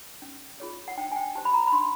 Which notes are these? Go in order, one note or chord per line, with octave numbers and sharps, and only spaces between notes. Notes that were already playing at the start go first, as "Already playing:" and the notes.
C#4
F4 G#4 C#5
F#5
D4 G5
G#5
G5
G4 C5 A5
B5
A#5
B5
D4 C6